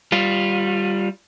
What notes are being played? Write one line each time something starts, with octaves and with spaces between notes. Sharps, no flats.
G3 F4